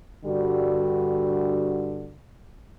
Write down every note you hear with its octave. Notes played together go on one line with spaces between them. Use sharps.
G2 D3 G3 F#4